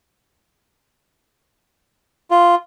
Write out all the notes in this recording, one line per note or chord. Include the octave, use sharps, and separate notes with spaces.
F4